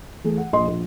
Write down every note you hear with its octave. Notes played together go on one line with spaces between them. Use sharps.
E3 A3 G#4
F#5
A#1 D#5 C6
A#1